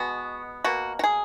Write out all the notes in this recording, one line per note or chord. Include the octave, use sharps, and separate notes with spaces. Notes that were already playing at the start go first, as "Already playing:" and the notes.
Already playing: B2 G#3 B3 F#4
B2 A#3 F#4
F#4
G#4